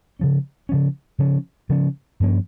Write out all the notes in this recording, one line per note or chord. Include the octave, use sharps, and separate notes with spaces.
C#3 F3 C#4
C#3 F3 C#4
C#3 F3 C#4
C#3 F3 C#4
G2 F3 A#3 C#4